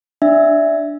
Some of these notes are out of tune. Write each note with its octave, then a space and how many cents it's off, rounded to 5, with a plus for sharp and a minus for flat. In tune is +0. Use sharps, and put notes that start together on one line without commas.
D4 +0 E5 +0